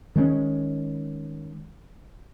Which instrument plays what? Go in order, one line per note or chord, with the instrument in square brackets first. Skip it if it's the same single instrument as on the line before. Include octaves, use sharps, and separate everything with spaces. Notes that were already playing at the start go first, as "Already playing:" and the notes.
[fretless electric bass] D#3 G#3 A#3 C#4